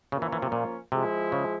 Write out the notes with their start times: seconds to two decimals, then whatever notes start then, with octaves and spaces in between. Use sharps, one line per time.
0.12 C#3 F3 A#3 C#4 F4
0.22 E3
0.32 E3
0.42 C3
0.52 A#2
0.92 C3 F3 G#3 E4
1.32 C#3